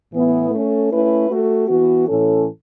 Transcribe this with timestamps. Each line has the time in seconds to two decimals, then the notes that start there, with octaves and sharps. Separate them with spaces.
0.11 A2 E3 B3 E4
0.51 A3 C#4 A4
0.90 A3 C#4 E4 B4
1.29 A3 F#4 A4
1.68 E3 B3 F#4
2.06 A2 E3 C#4 A4